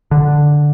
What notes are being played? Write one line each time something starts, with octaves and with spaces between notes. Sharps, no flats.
D3